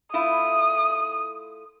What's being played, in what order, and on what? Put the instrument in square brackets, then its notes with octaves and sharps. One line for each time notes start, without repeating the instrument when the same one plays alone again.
[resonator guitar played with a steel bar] A3 E4 F4 [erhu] D#6